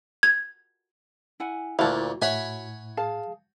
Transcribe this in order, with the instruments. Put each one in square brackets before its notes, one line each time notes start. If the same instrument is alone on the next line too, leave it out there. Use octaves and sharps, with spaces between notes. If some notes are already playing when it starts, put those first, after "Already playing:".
[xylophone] G#6
[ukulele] E4 F#5 G#5
[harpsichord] D2 A#2 [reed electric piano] E4 [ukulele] F#4 [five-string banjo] F5 F#5 A5
[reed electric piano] A2 [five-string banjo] E4 E5 [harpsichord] C#5 F#5 G#5
[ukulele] G#4 F5 A5